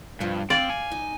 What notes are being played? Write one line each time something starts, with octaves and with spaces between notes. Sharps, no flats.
G2 B2 F3
C4 D5 F5
G#5
D#4